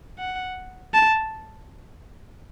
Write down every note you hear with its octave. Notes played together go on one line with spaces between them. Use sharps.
F#5
A5